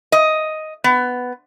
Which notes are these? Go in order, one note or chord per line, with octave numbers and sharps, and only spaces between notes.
D#5
B3